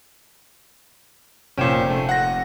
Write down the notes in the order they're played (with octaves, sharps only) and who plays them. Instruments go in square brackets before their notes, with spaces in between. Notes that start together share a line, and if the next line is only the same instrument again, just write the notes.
[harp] F1 G5 E7 [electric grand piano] A#2 C#4
[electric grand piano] A3
F#5 A#6